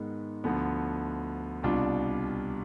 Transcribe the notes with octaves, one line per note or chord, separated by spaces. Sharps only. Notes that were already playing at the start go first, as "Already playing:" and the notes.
Already playing: G#2 D#3 G#3 B3 D#4
D2 D3 F3 B3
C2 B2 G3 D4 F4